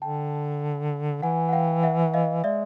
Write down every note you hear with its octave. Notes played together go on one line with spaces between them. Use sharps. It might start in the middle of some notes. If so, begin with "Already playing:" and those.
D3 G5 A5
E3 F#5 G#5
F#5
F5 G5
E5 F#5
D#5 F5
G#3 D5 E5